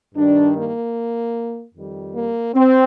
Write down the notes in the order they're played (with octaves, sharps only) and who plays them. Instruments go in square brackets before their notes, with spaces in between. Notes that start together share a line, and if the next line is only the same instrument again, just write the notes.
[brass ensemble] G2 D#3 G3 D4
A#3
F2 D#3 G3
A#3
C4